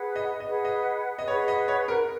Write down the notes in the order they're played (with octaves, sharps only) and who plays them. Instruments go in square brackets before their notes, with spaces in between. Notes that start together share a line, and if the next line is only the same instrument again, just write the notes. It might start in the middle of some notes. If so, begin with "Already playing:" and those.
Already playing: [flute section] G#4 B4 F#5
[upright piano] D#5
D#5
[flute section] G#4 B4 F#5
[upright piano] D#5
D#5
[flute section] G#4 B4 F#5 [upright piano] C#5
[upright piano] D#5
C#5
A#4